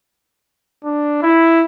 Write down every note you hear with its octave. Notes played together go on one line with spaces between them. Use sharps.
D4
E4